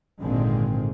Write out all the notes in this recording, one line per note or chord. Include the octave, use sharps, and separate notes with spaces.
G#1 A#2 D3 D#3 G#3 C4